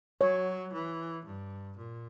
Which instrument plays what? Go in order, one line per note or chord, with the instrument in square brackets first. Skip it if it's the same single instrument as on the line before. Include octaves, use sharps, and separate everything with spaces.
[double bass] F#3 [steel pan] C#5
[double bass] E3
G2
A#2